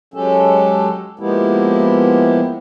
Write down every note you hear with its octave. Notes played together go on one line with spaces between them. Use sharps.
F#3 G#3 C#4 G4 A4
F3 G#3 A#3 B3 E4 G4